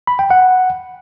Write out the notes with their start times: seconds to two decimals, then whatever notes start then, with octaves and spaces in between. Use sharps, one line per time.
0.07 B5
0.19 G5
0.30 F#5